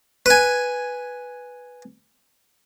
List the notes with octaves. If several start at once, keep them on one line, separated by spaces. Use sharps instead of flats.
B4 G#5